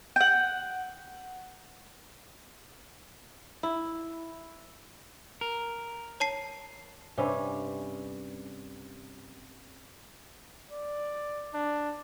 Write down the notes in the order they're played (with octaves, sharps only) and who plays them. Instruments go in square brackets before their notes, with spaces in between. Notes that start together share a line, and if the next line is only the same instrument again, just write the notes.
[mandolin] F#5 G5
[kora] E4
[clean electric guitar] A#4
[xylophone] C#5 A5 C7
[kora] G2 C3 G3 C#4
[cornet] D5
D4